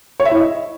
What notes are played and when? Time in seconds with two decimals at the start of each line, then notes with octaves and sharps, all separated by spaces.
0.20 C#5
0.25 E5
0.31 E4
0.37 D#5